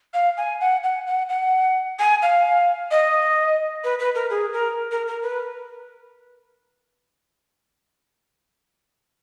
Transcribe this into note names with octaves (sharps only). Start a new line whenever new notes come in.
F5
G#5
F#5
F#5
F#5
F#5
G#5
F5
D#5
B4
B4
A#4
G#4
A#4
A#4
A#4
B4